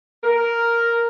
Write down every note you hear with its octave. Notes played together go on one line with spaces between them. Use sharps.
A#4